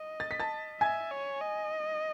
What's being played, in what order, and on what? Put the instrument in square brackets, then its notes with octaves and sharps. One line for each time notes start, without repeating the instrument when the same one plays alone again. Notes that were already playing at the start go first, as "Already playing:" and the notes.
Already playing: [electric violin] D#5
[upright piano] A6
B6
A5 A6
[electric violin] E5 [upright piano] G#5 G#6
[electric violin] C#5
D#5